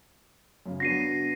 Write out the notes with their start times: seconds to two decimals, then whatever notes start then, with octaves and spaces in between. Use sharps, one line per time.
0.66 F#2 C#3
0.80 B3 D4 F#4 A#6 C7 D#7